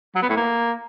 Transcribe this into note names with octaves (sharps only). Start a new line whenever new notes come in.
F#3
B3
A2
A#3